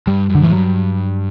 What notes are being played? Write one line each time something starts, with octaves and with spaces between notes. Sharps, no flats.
G2 G3
F#2
D3
A2 E3
G2 F#3